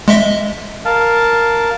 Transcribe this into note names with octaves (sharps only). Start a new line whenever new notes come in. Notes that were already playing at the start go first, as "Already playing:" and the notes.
G#3 D#5 E5
A#4 F5 A5